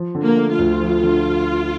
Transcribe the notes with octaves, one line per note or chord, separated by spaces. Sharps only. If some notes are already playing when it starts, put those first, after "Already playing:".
Already playing: F3
D3
A#3
A3
F4
D2
F3
D3